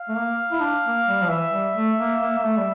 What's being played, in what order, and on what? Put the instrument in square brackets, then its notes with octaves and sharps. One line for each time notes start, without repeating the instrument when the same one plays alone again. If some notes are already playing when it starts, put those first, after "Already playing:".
Already playing: [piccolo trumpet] F5
[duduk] A3
A#3
E4
D4
A#3
G3
F3
[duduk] E3 [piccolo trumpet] E5
[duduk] G3
A3
A#3
A#3
A#3
A3
G3